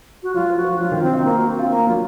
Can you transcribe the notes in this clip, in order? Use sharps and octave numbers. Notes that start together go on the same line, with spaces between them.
F#4
F#3 F4
F3
F#4
F3
F#3 F4
D#3
C4
D#4
A#3 F4
F#4
C4 F#4
F4
A#3
F#3 F4